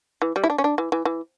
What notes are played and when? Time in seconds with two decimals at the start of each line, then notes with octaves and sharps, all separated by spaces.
0.22 E3
0.36 G3
0.44 E4
0.50 D4
0.58 C#4
0.64 D4
0.78 E3
0.92 E3
1.05 E3